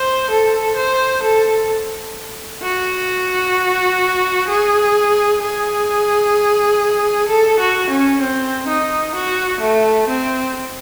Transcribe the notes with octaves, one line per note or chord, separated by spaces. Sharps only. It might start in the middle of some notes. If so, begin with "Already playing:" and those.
Already playing: C5
A4
C5
A4
F#4
G#4
G#4
A4
F#4
C#4
C4
D#4
F#4
A3
C4